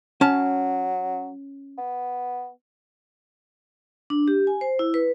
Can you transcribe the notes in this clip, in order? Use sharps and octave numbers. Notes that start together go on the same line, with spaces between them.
F#3 C#4 A5
B3
D4
G4
G#5
C5
E4
B4